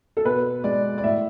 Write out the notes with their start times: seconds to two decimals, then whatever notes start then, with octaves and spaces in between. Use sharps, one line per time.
0.17 A4
0.24 B2 B4
0.64 G#3 D5
0.98 D5
1.03 A2 E5